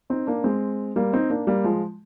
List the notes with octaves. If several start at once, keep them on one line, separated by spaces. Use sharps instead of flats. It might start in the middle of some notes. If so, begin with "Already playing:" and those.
C4 D#4
A#3 D4
G#3 C4
G3 A#3
C4 D#4
A#3 D4
G3 A#3
F3 G#3